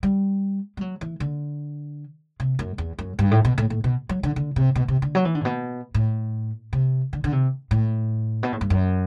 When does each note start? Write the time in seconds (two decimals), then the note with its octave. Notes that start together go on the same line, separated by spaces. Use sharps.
0.03 G3
0.77 G3
0.81 F#3
1.01 E3
1.20 D3
2.40 C3
2.59 F#2
2.78 E2
2.98 F#2
3.19 G2
3.31 A2
3.45 B2
3.58 A2
3.70 A2
3.84 B2
4.09 F#3
4.23 D3
4.36 D3
4.56 C3
4.75 B2
4.88 C3
5.02 D3
5.15 F#3
5.25 E3
5.35 D3
5.41 A2
5.45 B2
5.94 A2
6.73 C3
7.13 D3
7.24 D3
7.32 C3
7.71 A2
8.43 B2
8.52 A2
8.61 G2
8.70 F#2